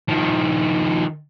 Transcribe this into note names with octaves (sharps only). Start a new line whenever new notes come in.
D#3 F3